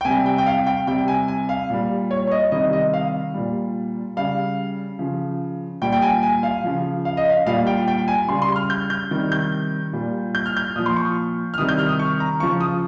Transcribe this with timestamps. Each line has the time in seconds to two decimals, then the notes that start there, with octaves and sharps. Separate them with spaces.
0.01 G5
0.05 C3 G3 G#5
0.26 G5
0.38 G5
0.46 F5
0.67 G5
0.87 C3 G3 G5
1.08 G#5
1.28 G#5
1.49 F5
1.70 A#2 G3
2.11 C#5
2.27 C#5
2.31 D#5
2.52 C3 D#3 G3 D#5
2.73 D#5
2.94 F5
3.34 A#2 G3
4.17 C#3 G3 F5
4.99 C#3 F3
5.82 A#2 G3 G5
5.92 G5
6.02 G#5
6.23 G#5
6.43 F5
6.64 C#3 F3
7.05 F5
7.17 D#5
7.29 F5
7.46 A#2 G3 F5
7.67 G5
7.88 G5
8.08 G#5
8.28 C#3 G3 C6
8.42 C6
8.56 F6
8.70 G6
8.90 G6
9.11 C3 D#3 G3
9.32 G6
9.93 A#2 G3
10.35 G6
10.46 F6
10.57 G6
10.76 A#2 D#6
10.79 F3
10.86 C6
10.96 C#6
11.54 F6
11.58 C3 D#3 G3 D#6
11.69 G6
11.79 F6
11.89 D#6
11.99 C#6
12.20 A#5
12.40 C#3 F3 C#6
12.61 D#6